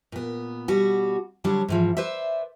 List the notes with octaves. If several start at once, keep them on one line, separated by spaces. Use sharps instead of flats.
A#2 B3
B2 G3 F#4
D3 F#3 G3 D4 C#5
G#2 E3 F3
B4 C5 D5 E5